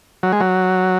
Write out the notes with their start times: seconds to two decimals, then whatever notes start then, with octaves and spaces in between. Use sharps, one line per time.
0.23 F#3
0.33 G#3
0.40 F#3